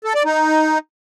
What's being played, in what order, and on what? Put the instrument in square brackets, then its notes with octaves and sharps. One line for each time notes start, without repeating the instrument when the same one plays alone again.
[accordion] A4
D5
D#4